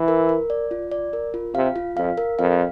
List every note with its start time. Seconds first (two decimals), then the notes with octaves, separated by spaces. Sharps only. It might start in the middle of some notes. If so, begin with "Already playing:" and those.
Already playing: E3
0.08 A#4
0.29 A#4
0.50 D5
0.71 F4
0.92 D5
1.13 A#4
1.34 F4
1.55 C3 F5
1.76 F4
1.97 F2 F5
2.17 A#4
2.39 F2 F5